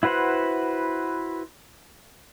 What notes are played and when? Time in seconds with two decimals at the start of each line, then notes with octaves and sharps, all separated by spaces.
0.03 E4 F#4 B4 C5 F#5